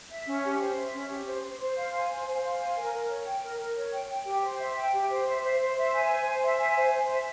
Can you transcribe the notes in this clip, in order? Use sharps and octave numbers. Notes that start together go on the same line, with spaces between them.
E5
C#4
G4
C5
E5
C#4
G4
C5
C5
C5
F5
G#5
C5
C5
F5
G#5
A#4
A#4
C#5
G5
A#4
A#4
C#5
G5
G5
G4
C5
E5
G5
G4
C5
E5
C5
C5
E5
G#5
C5
C5
E5
G#5
C5
C5
E5